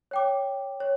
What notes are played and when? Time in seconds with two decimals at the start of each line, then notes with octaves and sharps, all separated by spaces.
0.11 C#5 G5 D6
0.80 C#5